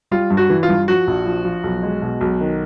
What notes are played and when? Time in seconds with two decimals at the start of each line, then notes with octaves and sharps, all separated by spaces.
0.11 G3 F4
0.30 G2
0.37 F#4
0.50 E3
0.63 F4
0.69 G2
0.88 F3 F#4
1.07 A#1
1.26 F3
1.45 F3
1.64 B1
1.83 G#3
2.02 B2
2.21 B1
2.40 D#3